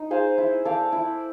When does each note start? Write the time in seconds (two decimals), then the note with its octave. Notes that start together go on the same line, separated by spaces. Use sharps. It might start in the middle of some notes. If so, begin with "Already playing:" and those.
Already playing: D#4
0.11 G#4 C5 F5
0.38 E4
0.65 A4 D5 F5
0.92 E4